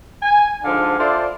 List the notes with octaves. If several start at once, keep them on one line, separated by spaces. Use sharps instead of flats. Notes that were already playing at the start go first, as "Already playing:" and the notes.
G#5
G#2 D3 F3 D4 F5 F#5
E4 F4 A4 C5 D5